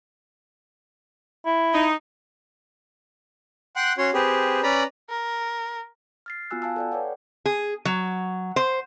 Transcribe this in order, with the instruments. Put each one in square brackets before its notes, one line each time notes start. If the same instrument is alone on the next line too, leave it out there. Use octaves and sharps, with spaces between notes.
[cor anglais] E4
[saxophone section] D#4
[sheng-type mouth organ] F#5 G5 C6 F#6
C#4 F#4 C#5 C6
C4 G4 G#4 B4
C#4 B4 D5 A#5 B5
[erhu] A#4
[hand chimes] F6 A6 C7
B3 F4 F#4 G#5 E6 F#6
F5 G#5 A5 E6
A4 D5 G5
B4 C#5 D5 F#5
[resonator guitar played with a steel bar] G#4
F#3
C5